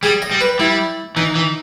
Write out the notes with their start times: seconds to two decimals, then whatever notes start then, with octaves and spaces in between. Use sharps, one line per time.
0.03 G3 G#4
0.22 D#5
0.31 G3
0.41 B4
0.59 G3 E4
1.16 E3 D#4
1.35 E3